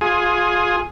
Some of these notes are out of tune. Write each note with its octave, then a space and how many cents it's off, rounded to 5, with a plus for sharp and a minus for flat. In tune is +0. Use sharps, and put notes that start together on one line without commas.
F4 +20 G#4 +0